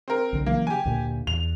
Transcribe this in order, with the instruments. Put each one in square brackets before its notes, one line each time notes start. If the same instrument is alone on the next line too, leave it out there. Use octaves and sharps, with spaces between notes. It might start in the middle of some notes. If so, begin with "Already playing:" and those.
[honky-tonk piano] C4 A#4
[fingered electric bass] B1 D3
[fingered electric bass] C#3 E3 F#3 [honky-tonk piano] A#3
[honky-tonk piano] G4 G#5
[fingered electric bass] D2 A#2
[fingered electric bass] E2 [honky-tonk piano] F7